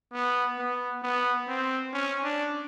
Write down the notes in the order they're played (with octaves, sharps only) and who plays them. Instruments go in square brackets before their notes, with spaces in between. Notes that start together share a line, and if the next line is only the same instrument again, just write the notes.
[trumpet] B3
B3
B3
C4
C#4
D4